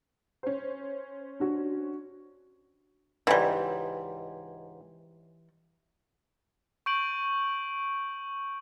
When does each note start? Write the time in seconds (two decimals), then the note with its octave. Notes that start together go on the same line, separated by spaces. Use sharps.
0.43 C#4 C5
1.40 D4 F#4
3.27 C#2 G#2 E3 G3
6.86 C#6 G6 D7 F#7